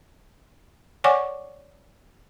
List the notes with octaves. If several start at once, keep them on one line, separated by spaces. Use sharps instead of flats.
C#5 D5 F#5 G#5 C#6 D6